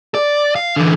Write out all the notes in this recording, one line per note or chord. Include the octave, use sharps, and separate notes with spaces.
D5
F5
D3 E3